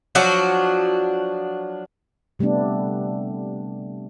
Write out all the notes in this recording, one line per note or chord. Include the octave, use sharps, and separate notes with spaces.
F3 F#3 D4 F#4
C3 G3 A3 B3 D4